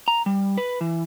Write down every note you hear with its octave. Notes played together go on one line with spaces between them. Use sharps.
A#5
G3
B4
E3